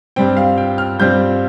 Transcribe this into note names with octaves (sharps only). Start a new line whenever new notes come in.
G2 G3 C4 G5
F5
G5
F6
G2 G3 C4 G6